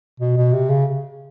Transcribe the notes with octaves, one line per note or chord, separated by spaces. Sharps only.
B2
B2
C3
C#3